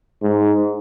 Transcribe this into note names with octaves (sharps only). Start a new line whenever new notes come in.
G#2